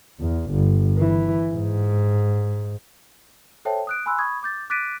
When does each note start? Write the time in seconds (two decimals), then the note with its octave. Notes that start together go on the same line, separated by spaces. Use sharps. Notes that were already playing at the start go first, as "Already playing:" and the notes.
0.20 E2
0.51 G1
0.97 E3
1.53 G#2
3.65 A4 C5 C#5 E5 G5 A5
3.87 D#6 F#6 D7
4.06 G#5 B5 C6 E6 F#6
4.18 B5 C#6 D#6 G#6
4.43 D6 G6 A6
4.70 D6 F#6 A6 B6 D7 D#7